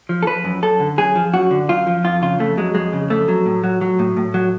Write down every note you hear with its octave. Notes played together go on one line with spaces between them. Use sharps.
F3
A4
F3 B4
F#2
F#2 A4
D3
F#2 G#4
F3
F#2 F#4
D3
F#2 F4
F3
F2 F4
C#3 F4
F2 A3
F#3 G#3
F2 G#3
C#3
F2 A3
F#3
A2
F#3
F#3
A2
A2
F#3